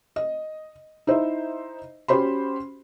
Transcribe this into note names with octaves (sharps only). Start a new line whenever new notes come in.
D#5
D#4 E4 C5 D#5 E5
C#4 F#4 G4 C5 B5 C6